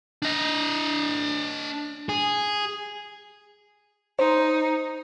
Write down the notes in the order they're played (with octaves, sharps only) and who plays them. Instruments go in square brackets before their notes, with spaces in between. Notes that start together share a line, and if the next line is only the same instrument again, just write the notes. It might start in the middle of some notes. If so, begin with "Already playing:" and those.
[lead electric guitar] D4 D#5
[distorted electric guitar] G#4
[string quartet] D#4 [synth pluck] C5